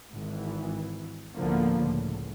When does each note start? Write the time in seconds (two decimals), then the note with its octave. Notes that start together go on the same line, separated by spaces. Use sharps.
0.12 G#1 G#2 E3
1.36 D2 A2 D3 F3 A#3 B3
1.81 C#2 A2